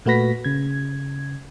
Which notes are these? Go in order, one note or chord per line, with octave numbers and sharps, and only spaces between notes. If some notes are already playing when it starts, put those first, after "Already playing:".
A#2 A3 F#4 B4 A#6 B6
C#3 G#6